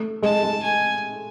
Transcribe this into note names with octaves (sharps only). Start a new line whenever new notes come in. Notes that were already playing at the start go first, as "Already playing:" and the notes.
Already playing: A3
G#3 A5
G#3
G#5